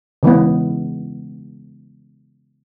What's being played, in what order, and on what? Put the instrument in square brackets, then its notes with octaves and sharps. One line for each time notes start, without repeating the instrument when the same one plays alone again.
[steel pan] C#3 E3 G#3 B3